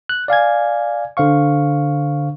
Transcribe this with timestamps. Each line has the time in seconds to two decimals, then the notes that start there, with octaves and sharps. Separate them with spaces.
0.09 F#6
0.28 D5 F5 G#5 G#6
1.17 D3 C5 F5 C#6